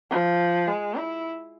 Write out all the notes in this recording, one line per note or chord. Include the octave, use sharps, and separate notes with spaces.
F3
G#3
E4